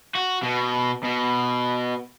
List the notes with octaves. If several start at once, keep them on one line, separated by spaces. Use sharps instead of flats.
F#4
B2
B2